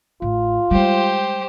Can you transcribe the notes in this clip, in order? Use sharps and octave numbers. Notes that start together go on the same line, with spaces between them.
A1 F4
G3 G#3 G4 C5